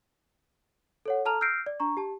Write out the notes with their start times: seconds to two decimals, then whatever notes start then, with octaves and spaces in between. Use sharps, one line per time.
1.06 A4 C#5 F#5
1.25 A4 A5 A#5 F6 F7
1.41 E6 F6 G6 A#6 C7 D7
1.66 D5
1.80 D4 A#5 C#6
1.97 G4 A5